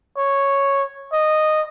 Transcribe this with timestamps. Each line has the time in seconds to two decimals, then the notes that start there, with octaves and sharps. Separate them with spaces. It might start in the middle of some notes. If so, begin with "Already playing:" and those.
0.18 C#5
1.13 D#5